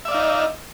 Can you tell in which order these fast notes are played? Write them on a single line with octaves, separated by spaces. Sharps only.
E5 D5 F5 D#4